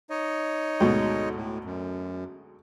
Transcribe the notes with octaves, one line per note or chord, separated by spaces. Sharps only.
D#4 C#5 D#5
D2 G#2 B2
A2
F#2